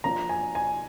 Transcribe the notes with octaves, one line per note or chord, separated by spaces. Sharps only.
F3 A#3 D4 A#5
G#5
G#5